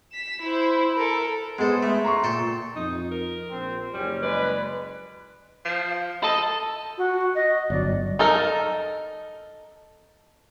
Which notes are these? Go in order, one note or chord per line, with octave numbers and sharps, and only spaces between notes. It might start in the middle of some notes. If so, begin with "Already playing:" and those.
B6 E7
E4 C5
A4 A#4
G#3 B3 G#4 A4 C5
A3 D6
A#5 C6 C#6
A#2 A4 G5 A5
F2 D#4
A#4
A#1 C4
F#1 G3 C#4
G#3 B4 D5
F3
A4 D#5
F#4
D#5
G1 F#2 F#3 D5
D#4 A4 A#4